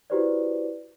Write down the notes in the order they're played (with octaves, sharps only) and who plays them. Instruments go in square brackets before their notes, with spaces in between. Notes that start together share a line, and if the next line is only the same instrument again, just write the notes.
[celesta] E4 F#4 G4 B4 C5 D5